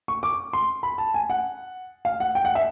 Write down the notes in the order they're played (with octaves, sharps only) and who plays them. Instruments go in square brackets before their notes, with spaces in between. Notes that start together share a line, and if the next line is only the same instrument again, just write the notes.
[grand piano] C#6
D6
C6
B5
A5
G#5
F#5
F5
F#5
G5
F#5
E5